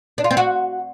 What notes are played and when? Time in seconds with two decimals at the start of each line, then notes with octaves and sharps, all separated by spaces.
0.18 D4
0.24 F4
0.31 C4
0.37 F#4